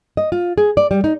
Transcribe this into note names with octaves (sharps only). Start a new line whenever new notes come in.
D#5
F4
G#4
D5
G3
D#4